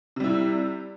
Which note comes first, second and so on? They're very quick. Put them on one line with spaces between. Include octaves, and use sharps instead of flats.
C3 G3 E4